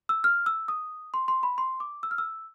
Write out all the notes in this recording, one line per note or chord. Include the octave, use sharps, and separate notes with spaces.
E6
F6
E6
D#6
C6
C6
B5
C6
D6
E6
F6
E6